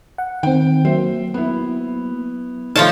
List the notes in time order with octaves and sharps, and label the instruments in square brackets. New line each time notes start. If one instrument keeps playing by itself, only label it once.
[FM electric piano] F#5
[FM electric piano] D#3 C4 [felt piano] G5
[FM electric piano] F#3 A#3 [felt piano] C5 E5
[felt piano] B3 E4
[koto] F3 A3 A5 [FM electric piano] D#4 [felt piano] C#5 C6 F6